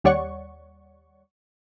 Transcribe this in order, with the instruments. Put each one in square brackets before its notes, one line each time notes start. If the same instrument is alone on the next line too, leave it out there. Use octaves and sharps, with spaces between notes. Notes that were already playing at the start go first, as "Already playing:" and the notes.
[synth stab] D#2 G3 C#5 D5 F#5 C#6